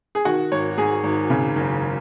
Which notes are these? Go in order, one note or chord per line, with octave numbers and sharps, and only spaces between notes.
G#4
D#3 F#4
G#1 C#5
G#2 G#4
G#1
C#3
F#1